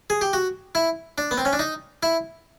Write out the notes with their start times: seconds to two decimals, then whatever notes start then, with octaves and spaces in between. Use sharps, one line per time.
0.10 G#4
0.21 G4
0.33 F#4
0.75 E4
1.18 D4
1.31 B3
1.38 C4
1.45 C#4
1.53 D4
1.59 D#4
2.03 E4